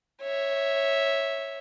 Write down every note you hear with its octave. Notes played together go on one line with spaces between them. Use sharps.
C#5 E5